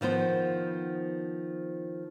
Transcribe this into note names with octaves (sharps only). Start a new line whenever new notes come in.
D#3 F3 B3 C5